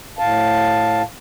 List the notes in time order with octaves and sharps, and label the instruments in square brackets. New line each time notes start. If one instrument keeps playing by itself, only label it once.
[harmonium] A2 F5 A5